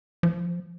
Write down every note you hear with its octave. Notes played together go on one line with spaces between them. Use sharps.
F3